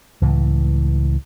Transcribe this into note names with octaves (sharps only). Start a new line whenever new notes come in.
C#2 A2 E3